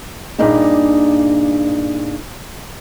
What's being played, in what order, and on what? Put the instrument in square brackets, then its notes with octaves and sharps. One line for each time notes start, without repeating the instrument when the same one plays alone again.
[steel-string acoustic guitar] G2 A#2 D4 D#4 G#4